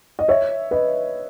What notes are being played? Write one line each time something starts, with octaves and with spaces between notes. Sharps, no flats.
D#5
C#5 E5
B4 D#5